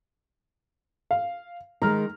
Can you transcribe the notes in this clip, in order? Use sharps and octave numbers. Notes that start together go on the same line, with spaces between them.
F5
D#3 G#3 A#5 F6